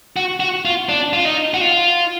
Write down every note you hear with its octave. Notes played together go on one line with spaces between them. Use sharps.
F#4
F#4
F4
D4
F4
D#4
F#4
F4